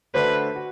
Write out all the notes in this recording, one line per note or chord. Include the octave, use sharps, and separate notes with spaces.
D3 A3 D4 F#4 B4 C5
F#4